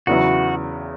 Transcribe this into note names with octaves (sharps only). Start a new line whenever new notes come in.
E2 C#3 F#3 B3 E4 F#4